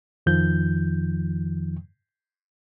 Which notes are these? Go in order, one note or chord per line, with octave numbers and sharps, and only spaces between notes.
F2 D#3 F3 G6